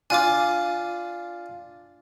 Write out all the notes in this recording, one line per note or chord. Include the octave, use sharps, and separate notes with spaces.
D4 F4 D5 G#5 D6